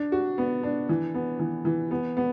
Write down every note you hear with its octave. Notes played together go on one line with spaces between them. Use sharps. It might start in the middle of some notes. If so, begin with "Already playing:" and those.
Already playing: D4
F#4
B3
D4
E3
B3
E3
E3
B3
B3